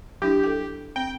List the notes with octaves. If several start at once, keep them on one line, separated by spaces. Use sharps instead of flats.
F#3 D4 E4 G4
A4 G5
C4 G5